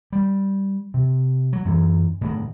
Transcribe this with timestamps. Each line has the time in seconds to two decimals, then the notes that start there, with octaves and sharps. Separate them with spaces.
0.13 G3
0.94 C3
1.53 F#3
1.65 F#2 E3 F#3
2.21 A2 D3 D#3